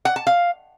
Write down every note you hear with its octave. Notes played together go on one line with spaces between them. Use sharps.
F#5
A5
F5